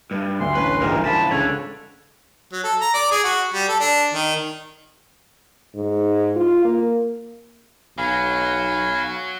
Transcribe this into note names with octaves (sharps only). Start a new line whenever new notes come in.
G2
D2 C6
A1 C#4 B4 A5
A#1 G#2 E3 G4 A#4
C#2 E3 F3 G3 A5 B5
C#2 D3 C#5
F#3
A4
A#5
D5
G#4
F#4
G3
A4
D4
D#3
G#2
F4
A#3
B1 F#3 F5 G#5 B5